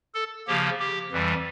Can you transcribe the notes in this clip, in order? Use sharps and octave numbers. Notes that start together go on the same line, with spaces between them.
A4
C#3 F3 A#3 G4
G4
F2 E3 G3